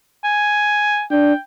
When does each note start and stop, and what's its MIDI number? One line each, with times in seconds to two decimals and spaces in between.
0.24 1.04 80
1.11 1.33 62
1.11 1.40 79